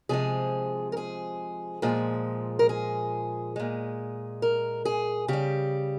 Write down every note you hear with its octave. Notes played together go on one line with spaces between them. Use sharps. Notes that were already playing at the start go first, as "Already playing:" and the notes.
C3 F3 G#3 G#4
A#4
G#4
A#2 F3 G#3
A#4
G#4
A#2 G#3
A#4
G#4
C#3 G3 G4